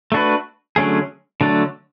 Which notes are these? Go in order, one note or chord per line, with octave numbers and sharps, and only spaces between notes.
A3 D4 F#4 B4
D3 F#3 A3 C#4 G#4
D3 F#3 A3 D4